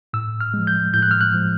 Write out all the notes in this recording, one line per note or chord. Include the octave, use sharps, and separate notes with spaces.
A2 E6
F6
F3 G#3
G6
A2 G6
F#6
F6
F#6
F3 G#3